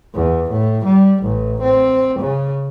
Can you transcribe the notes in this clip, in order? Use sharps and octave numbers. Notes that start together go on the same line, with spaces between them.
E2
A2
G3
A1
C4
C#3